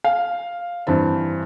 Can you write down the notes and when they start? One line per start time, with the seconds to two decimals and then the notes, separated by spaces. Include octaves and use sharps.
0.04 F5
0.87 G2 E3 C4 A5